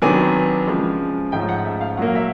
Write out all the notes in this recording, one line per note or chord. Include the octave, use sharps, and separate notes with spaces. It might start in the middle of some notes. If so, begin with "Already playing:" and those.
C3 D#3 F#3 B3 D4 G#5
C#3 F3 G#3
G#2 F3 A3 C#4 G5
F#5
E5
F5
A#2 F#3 A#3 F#5
F5
E5